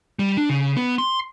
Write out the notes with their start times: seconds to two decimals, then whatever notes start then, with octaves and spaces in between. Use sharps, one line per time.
0.19 G3
0.37 D4
0.49 C#3
0.77 B3
0.98 C6